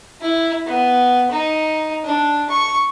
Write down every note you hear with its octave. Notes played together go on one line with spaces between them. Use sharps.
E4
B3
D#4
D4
C#6